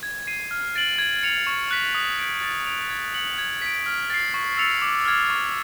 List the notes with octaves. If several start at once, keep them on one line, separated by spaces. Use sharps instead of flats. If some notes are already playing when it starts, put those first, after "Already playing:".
G#6
C7 D#7
F6
A6 D7 F#7
G#6
C#7 F7
C#6
F#6 B6
D#6
G6 B6 D7
A6
D7 F7
G#6
C#7 F#7
G#6
B6 D7
F6
A6 C7
C#6
E6 A6 C#7 F7
D6
F6 G#6
C#6